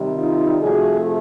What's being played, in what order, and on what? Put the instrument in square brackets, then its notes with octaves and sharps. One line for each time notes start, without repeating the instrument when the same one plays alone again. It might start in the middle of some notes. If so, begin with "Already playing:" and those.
Already playing: [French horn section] C3 D#3 G3
D#4 F4
C3 F3 A3 F#4 G#4